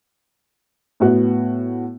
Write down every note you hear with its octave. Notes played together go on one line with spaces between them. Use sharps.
A2 B3 F#4